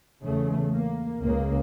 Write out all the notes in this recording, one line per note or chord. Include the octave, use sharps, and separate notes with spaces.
E2 C#3 A3
A#3
C#2 C#3 A#3